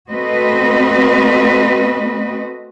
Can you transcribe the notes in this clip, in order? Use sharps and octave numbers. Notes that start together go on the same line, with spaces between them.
A3 C4 F#4 B4 D#5